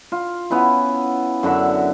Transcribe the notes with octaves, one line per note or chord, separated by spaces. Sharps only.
F4
B3 C#4 E4
F#2 D3 F#4 E5